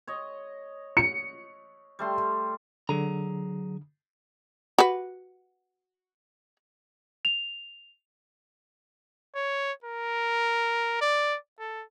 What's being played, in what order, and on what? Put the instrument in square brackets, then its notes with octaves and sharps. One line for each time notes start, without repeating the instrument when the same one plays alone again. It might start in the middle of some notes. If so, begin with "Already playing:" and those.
[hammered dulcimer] C#5 D#5
[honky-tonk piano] C#7
[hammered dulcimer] G3 A3 C6
[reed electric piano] D3 [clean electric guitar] F#3 G#4 A#5
[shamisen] F#4 B4
[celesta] F7
[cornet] C#5
A#4
D5
A4